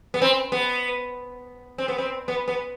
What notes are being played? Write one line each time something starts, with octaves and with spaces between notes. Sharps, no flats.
B3
C4
B3
C4
B3
C4
B3
B3